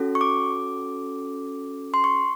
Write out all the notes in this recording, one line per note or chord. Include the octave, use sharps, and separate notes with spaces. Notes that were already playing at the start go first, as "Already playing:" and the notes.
Already playing: C#4 F#4 A4
C#6
D6
C6
C#6